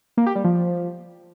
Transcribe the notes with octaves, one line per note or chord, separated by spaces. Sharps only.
A#3
G4
G3
F3